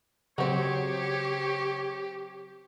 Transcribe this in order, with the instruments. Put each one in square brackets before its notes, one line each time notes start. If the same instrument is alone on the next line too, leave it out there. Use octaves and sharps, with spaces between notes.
[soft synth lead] C#3 [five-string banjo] F#3 C4 [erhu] G4 [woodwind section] G#4 C5 C#5